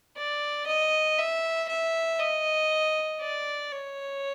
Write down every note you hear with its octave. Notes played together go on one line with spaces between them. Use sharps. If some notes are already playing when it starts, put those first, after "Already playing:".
D5
D#5
E5
E5
D#5
D5
C#5